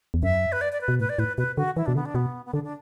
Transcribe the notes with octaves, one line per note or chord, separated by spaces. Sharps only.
E2
F#2 E5
B4
D5
D5
B4
B2
A2 B4
D5
A2 B4
B2 B4
D3 F#4
E3 E4
B2 D4
D3 B3
D4
B2 B3
B3
D3 D4
D4